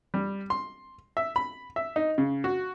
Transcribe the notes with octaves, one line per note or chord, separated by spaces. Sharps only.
G3
C6
E5
B5
E5
D#4
C#3
F#4